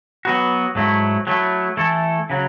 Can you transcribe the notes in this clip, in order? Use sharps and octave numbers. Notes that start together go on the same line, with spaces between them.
F#3 B3 F#4
G#2 F#3 A3 E4
F#3 A3 E4
E3 A3 E4 A4
C#3 F#3